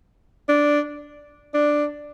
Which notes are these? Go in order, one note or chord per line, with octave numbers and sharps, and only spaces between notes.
D4
D4